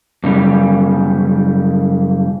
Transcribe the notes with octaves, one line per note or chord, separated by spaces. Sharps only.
F#2 C#3 G3